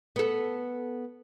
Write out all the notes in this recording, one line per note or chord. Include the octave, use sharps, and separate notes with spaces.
B3 A4